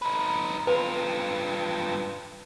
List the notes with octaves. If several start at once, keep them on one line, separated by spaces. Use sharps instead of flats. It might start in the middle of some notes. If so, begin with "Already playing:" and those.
D#4 B4
G2 F4 B4